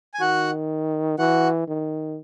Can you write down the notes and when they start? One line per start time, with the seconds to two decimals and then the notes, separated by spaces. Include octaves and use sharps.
0.14 G#5
0.20 D#3 F#4 F#5
1.18 E3 F#4 F#5
1.68 D#3